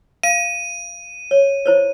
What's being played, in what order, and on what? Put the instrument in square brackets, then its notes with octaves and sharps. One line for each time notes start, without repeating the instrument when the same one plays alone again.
[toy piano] F5 [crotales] D#7
[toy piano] C#5
E4 C5 C#5